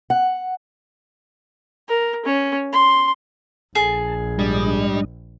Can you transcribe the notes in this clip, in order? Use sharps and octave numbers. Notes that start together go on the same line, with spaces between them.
F#5
A#4
C#4
C6
A#1 G#4 A5
G#2 G3 D4 D#5